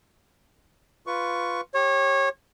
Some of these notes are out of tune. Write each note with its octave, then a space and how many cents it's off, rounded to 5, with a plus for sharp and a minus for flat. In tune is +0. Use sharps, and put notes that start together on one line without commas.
F4 +0 B4 +5 C#6 +10
G4 +0 C#5 -25